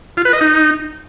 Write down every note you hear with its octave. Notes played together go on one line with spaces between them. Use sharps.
F4
B4
D#5
D#4